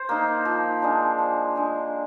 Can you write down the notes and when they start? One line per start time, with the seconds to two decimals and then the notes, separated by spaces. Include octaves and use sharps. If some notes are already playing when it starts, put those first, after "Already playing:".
Already playing: C5
0.09 A#3 D#4
0.45 F3
0.82 G#3 D4
1.18 F3
1.56 G#3 D4